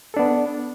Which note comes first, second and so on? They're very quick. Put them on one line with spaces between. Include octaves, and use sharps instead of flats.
A4 D4 B3